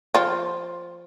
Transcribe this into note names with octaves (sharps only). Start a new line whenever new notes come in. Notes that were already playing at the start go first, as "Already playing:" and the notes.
F3 F4